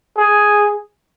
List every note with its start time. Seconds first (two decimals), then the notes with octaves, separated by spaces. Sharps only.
0.18 G#4